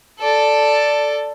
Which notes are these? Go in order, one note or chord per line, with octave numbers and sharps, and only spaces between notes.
A4 D5